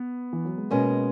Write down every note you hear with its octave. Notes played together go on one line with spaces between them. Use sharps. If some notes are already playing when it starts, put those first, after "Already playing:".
Already playing: B3
E3
F#3
G#3
B2 G#3 A#3 C#4